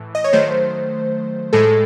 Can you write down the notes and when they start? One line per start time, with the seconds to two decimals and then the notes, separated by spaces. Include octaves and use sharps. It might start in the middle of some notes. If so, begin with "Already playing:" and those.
Already playing: A2 E3
0.15 D#5
0.24 C#5
0.33 D#3 F#3 A3 C5
1.53 A2 G#3 A4